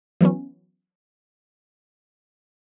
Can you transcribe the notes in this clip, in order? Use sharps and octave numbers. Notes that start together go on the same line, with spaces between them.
E3 F#3 B3 C#4